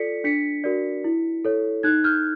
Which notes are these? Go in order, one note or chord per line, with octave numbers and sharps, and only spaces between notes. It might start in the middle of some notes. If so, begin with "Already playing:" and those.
Already playing: F4 A4 D5 B6 C#7
D4 B6 C#7
F#4 A#4 D5
E4
A4 C#5
D#4 F#6 G#6
F6 G6